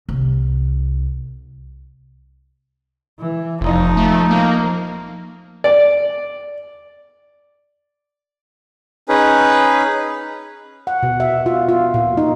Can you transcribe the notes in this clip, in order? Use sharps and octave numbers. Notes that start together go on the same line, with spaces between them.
C2
E3
F1 F3 D#4
A3
A#3
D5
C#4 D#4 G#4 B4
F#5
B2
E5
F4
F4
A#2
D#4